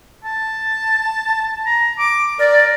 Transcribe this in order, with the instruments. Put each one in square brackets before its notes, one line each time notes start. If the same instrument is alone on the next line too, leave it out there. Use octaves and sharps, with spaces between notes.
[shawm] A5
A#5
D6
[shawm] A#4 [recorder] D5